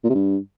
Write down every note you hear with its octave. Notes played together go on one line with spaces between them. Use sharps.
A#2
C3
G2